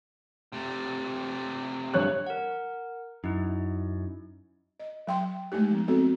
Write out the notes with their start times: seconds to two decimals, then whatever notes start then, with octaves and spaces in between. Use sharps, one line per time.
0.53 C3 A3
1.94 G2 C#5 F#6
2.27 A#4 F#5
3.24 F#2 D#4 E4
4.80 D#5
5.07 F#3 G5 C6
5.52 G#3 A3 D#4 G4
5.71 F3 B3
5.88 B3 C4 F#4 A4